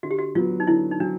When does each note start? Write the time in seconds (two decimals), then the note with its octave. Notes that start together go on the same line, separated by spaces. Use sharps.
0.03 D3 F#4
0.11 G4
0.19 F#4
0.35 F#3 B3 F4
0.60 D#4
0.67 D3 E4
0.91 D#4
1.00 F#3 D4